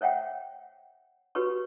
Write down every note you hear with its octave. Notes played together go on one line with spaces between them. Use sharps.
C5 C#5 E5 F#5 G5
F#4 G4 B4 C#5 C#6